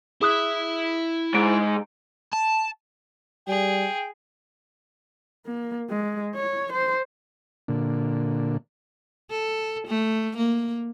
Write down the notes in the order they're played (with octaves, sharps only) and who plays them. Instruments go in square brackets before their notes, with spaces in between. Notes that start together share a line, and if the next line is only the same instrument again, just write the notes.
[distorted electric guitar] E4 E5 [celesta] G#4 D#6 F#6
[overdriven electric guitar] G#2 [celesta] D7
[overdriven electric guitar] A5
[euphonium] G3 [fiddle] G#4 [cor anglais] G5
[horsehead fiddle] A#3
G#3
C#5
C5
[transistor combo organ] A#2 D3
[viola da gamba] A4
A3
A#3